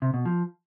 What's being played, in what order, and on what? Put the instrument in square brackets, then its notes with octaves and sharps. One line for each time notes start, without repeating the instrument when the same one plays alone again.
[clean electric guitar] C3
B2
F3